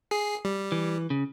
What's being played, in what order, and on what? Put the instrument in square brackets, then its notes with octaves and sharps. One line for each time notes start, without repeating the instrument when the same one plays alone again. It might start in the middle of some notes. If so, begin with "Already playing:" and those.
[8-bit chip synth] G#4 C7
G3
[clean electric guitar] E3
C#3